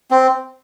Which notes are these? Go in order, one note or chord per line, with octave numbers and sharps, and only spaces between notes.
C4